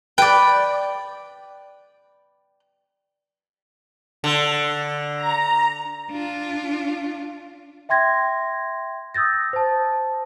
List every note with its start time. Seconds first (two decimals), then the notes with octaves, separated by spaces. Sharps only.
0.18 B4 D5 G5
4.24 D3
5.16 A#5
6.11 D4 F4
7.89 E5 G5 C6 G#6 A#6
9.14 D#6 E6 G6 A6 A#6
9.53 C5 A5